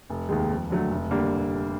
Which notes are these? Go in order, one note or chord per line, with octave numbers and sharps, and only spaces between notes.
F1
D#2 D#3 G#3
F2
D3 F#3 A3
F1
D3 G3 A#3